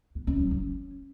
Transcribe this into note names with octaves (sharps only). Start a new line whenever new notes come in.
B3
C#4
F#3
C#4